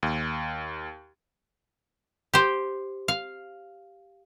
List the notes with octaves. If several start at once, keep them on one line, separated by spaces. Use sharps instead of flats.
D#2
G4 C5
F5